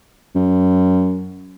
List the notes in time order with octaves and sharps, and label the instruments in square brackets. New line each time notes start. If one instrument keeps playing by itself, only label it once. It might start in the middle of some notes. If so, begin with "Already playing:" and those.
[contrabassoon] F#2